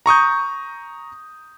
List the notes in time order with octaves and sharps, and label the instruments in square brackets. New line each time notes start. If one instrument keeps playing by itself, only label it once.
[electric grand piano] A#5 C#6 D#6 G6